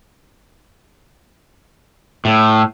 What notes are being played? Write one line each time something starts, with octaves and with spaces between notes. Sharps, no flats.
A2